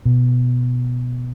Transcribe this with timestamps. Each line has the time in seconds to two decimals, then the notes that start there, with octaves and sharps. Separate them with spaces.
0.05 B2